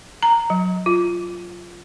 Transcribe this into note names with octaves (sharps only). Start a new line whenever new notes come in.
A#5
F#3
F4